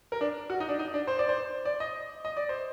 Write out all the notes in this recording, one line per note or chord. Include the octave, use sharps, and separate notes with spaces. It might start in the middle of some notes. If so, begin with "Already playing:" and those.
A#4
D4
F#4
D#4
D4
D#4
D4
C5
D5
C5
D5
D#5
D#5
D5
C5